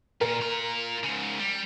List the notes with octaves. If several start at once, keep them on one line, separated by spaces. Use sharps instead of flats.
A#2 A#4
F4 A#5
G#2 C#3
G3